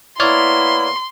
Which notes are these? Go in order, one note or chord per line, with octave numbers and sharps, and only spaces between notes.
A#3 B3 E4 C#5 D5 C6 F6